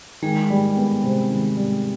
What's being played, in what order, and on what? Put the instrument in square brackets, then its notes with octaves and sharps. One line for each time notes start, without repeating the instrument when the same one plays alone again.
[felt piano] D#3 [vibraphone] G#3 G#4
[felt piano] G3
B3
C3
D#3
G3